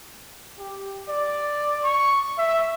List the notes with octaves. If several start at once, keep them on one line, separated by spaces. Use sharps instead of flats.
G4
D5
C#6
E5